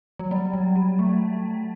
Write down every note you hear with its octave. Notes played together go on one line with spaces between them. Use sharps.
F#3
G3
F#3
G3
A3